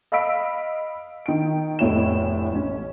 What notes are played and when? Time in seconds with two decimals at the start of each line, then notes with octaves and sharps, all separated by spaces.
0.12 D#5 F5 B5 E6 B6 D7
1.26 D#3 D7
1.79 F1 D2 A2 E4 C#5 E7
2.53 A1 C#4